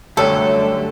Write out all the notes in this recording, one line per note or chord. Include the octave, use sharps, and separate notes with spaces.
F#2 D3 F#3 G3 A3 A4